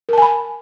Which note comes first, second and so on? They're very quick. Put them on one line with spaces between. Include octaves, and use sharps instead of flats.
A#4 A5 G#5 B5